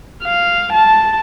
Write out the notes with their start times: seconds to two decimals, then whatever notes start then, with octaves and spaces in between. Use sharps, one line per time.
0.23 F5
0.73 A5